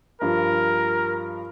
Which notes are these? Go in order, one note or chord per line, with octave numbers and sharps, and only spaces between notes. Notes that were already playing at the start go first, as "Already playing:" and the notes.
G2 F3 A#4